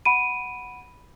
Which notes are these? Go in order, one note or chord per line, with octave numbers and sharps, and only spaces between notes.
F#5 B5 D7 D#7